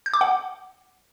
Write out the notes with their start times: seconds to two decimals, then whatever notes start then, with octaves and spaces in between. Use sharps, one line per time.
0.06 G6
0.14 D6
0.21 F#5